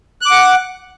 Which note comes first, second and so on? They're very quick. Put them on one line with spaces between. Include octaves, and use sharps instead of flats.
F#6 D6 F#5